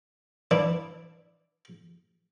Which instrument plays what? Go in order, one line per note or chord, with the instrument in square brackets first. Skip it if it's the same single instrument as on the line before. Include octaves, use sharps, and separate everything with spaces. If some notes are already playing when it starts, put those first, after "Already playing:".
[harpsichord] E3 D4 E4